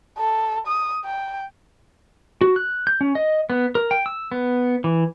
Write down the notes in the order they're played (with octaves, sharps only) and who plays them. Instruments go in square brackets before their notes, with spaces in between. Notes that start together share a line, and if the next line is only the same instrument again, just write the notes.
[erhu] A4
D#6
G5
[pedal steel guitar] F#4
F#6
G6
C#4
D#5
B3
A#4
G5
E6
B3
E3